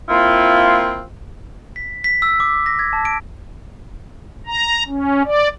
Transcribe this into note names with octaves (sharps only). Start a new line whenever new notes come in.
A#3 C4 E4 F4
B6
B6
E6
D6
A#6
G#6
A5
D7
A#5
C#4
D5